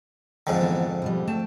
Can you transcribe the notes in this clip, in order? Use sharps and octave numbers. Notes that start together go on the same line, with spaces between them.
F2 G#2 D3
E3 B3
B2 F3 G3
A3 G5 A5